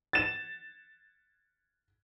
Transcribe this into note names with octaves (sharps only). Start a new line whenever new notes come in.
A6 E7